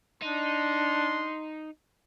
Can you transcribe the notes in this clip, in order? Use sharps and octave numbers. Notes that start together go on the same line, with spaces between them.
D4 D#4 C6